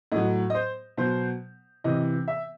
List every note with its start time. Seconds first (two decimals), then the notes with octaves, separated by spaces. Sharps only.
0.12 A2 F#3 D#5
0.50 D#5
0.55 C5
0.98 B2 F#3 C5
1.84 C3 E3 D#5
2.28 E5